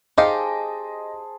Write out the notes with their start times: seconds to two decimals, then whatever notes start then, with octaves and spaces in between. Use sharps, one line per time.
0.18 D#4 G4 G#4 C5 D#5 F5 A5